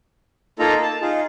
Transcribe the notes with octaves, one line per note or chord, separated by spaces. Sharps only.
A#3 D#4 F4 A4 A#5
A5
D#4 F4 G#4